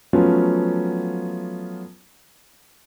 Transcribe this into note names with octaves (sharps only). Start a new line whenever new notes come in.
F3 F#3 A3 B3 C#4 F4